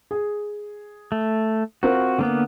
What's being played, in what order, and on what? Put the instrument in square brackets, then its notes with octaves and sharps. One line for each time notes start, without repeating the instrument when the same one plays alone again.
[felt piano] G#4
[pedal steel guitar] A3
[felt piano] C4 F4 A#4 [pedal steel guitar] F#4
[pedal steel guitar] D3 A#3 B3